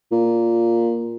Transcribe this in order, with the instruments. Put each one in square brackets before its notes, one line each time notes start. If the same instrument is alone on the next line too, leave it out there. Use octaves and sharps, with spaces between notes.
[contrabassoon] A#2